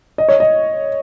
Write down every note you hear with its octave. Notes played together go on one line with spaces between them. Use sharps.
D#5
C#5
D#5